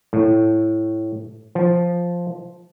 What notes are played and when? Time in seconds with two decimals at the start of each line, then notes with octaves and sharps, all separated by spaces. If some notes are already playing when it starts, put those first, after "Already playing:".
0.13 A2
1.55 F3